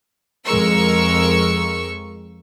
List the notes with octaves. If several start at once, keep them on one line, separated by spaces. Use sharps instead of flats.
F2 G#3 A#4 C#6 E6